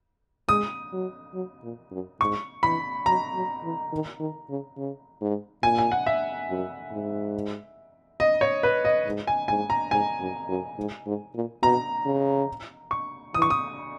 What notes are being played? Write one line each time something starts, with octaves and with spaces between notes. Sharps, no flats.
G#3 D#6
F#3
F#3
A#2
F#2
G#2 C#6
E3 B5
F#3 A#5
F#3
E3
D#3
D#3
C#3
C#3
G#2
A#2 G#5
G#5
F#5
E5
F#2
G#2
D#5
C#5
B4
D#5
G#2
G#5
G#2 G#5
A#5
G#2 G#5
F#2
F#2
G#2
G#2
A#2
B2 A#5
C#3
C#6
E3 D#6
C#6
D#6